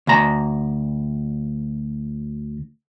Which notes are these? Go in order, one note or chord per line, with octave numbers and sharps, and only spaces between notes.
D2 A#5